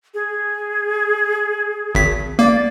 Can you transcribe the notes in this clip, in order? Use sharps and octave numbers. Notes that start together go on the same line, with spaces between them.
G#4
G#1 B6
A#3 D5